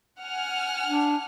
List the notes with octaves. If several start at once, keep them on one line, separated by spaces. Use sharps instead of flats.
F#5 G#5 F6
D4